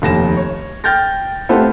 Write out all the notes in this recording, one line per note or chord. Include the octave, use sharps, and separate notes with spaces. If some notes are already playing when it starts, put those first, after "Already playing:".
F1 D#2 A#6 E7
C#5
G5 F6 G6 A6 A#6
A3 B3 C4 F4 G4 A4